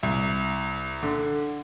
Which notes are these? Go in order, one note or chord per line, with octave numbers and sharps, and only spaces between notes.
C2
D3